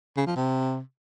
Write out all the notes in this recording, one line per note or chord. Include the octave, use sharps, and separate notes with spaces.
C#3
F3
C3